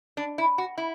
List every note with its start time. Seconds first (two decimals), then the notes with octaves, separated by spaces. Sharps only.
0.17 D4
0.38 E4
0.58 F#4
0.78 E4